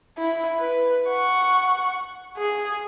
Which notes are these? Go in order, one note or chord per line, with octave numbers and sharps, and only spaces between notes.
E4
B4
F#5 C#6
G#4